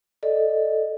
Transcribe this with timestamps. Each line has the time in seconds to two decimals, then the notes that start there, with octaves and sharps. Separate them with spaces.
0.23 A4 D5 D#5